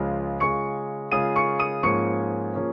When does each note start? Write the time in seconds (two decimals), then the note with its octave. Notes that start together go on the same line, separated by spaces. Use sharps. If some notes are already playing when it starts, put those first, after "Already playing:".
Already playing: C#2 C#3 F3 G#3 F4
0.40 C#3 G#3 F4 G#4 C#6 C#7
1.11 C#3 G#3 F4 G#4 D#6 D#7
1.36 C#6 C#7
1.59 D#6 D#7
1.83 G#2 F3 A#3 C#4 G#4 C#6 C#7
2.54 F3 A#3 C#4 G#4